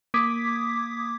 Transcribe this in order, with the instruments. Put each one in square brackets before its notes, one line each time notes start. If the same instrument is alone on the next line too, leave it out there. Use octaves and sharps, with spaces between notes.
[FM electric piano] A#3 D6 D#6 G#6 B6